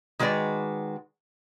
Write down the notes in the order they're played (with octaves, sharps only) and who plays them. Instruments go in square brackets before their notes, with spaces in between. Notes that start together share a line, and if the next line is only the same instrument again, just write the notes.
[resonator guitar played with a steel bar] D#3 G#3 F#4 B4 D5